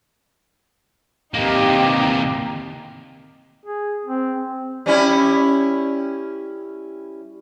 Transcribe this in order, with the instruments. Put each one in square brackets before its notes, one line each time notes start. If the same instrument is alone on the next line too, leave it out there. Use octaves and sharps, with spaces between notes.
[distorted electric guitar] C3 A#3 [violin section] D#4 G4
[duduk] G#4
C4
[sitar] G3 C#4 E4